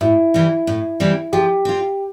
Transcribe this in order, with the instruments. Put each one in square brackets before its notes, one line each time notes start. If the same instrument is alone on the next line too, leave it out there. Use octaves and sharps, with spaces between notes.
[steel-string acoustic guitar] A2 [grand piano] E4
[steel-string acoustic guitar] E3 G3 C4
A2
E3 G3 C4
[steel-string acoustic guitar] F3 [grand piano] G4
[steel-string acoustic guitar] C4 F4